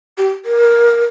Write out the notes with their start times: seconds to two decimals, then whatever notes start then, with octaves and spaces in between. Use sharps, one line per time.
0.17 G4
0.45 A#4